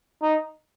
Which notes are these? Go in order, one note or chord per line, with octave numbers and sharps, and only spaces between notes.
D#4